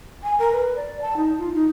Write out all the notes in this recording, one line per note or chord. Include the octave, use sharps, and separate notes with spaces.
G#5
A#4
B4
D5
A5
D#4
F4
D#4